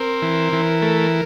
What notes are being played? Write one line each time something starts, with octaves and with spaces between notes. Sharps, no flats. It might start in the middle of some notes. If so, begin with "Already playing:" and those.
Already playing: C4 A#4
E3
E3
A3